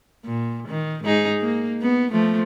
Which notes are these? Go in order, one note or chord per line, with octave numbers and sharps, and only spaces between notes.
A#2
D#3
G#2 D#4 G#4
A#3
B3
F3 A3